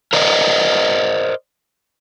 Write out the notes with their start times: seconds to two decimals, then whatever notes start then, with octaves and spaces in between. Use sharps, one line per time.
0.13 A#4 C5 D5 D#5